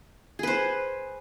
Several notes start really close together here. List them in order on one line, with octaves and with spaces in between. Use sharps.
G#4 B4 C5